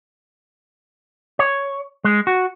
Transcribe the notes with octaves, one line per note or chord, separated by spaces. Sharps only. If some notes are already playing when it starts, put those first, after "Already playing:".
C#5
G#3
F#4